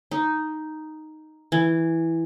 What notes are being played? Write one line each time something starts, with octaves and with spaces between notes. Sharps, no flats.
D#4
E3